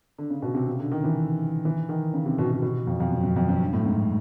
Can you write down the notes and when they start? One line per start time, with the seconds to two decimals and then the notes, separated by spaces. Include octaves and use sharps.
0.18 D3
0.30 C#3
0.42 B2
0.55 C3
0.67 C#3
0.79 D3
0.92 D#3
1.04 E3
1.65 E3
1.89 D#3
2.14 C#3
2.26 C3
2.38 B2
2.51 B2
2.62 B2
2.87 F2
3.00 F2
3.12 F#2
3.24 F#2
3.36 F2
3.49 F#2
3.61 G2
3.73 A2
3.86 G#2